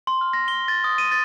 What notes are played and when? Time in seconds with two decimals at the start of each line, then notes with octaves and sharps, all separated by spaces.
0.07 C6
0.21 F6
0.33 A#6
0.48 G7
0.68 A6
0.84 D#6
0.98 D#7
1.12 A6